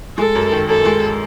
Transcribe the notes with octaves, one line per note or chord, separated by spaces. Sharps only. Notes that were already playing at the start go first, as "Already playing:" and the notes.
G#3 A4
F#2
D#3
F#2 A4
G#3